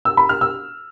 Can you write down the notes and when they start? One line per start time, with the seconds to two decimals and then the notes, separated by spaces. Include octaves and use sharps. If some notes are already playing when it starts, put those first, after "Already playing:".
0.05 E6
0.17 B5
0.29 F6
0.41 E6